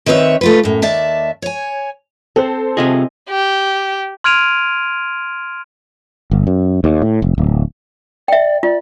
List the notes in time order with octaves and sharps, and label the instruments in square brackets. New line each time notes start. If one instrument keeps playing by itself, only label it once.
[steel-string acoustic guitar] D#3 C4 B4 C#5 E5
A3 F4 B4
F#2 A2
D#2 D5 E5 A5
C#5 G#5
[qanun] C4 [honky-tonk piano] A4 C5
[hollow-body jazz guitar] C3 F4 G#4 [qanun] D#5 E5 G#5
[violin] G4
[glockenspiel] C6 F6 G#6 D7 D#7 F7
[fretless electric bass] G1
F#2
D#2
A2
F1
D1
[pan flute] D5 [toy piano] E5 G5
[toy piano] F4 [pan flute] D5